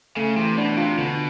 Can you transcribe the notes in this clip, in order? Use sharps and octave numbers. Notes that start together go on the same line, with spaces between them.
C#3 A3
C3 E3
B2 D4
C3 F4
B2 D3